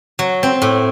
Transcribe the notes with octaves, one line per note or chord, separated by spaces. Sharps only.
F#3
C4
A2